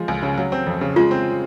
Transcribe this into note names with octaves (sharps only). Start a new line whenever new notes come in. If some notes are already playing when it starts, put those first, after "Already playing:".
Already playing: F3 G#3
C#2
C#3
F#3
C4
F2
C#3
G#3 F4
C4